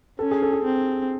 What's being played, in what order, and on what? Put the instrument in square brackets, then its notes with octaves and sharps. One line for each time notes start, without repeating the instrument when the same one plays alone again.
[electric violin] C#4 [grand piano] A4
[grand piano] G#4
A4
G#4
[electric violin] C4